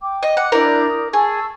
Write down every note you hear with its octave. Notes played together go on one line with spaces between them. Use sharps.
G5 D6
D#5
F#5
D4 E4 A#4 D5 G6
D#6
G#4 A5 C#6 E6